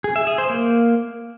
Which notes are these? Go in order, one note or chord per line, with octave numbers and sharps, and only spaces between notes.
G#4
E5
G#4
C5
A#3